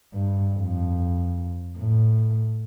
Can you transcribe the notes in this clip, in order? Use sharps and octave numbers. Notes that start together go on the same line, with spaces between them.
G2
F2
A2